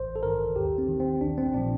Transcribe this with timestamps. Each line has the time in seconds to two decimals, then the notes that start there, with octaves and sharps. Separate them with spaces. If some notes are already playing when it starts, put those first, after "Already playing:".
Already playing: A1 C5
0.16 A4
0.23 G2 D#3 A#4
0.56 D#2 G4
0.78 C4
0.89 D#3
1.00 C4
1.21 A#1 D4
1.38 C4
1.54 A#2 F3 D4